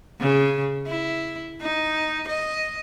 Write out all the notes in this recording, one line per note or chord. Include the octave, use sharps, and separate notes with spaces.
C#3
E4
D#4
D#5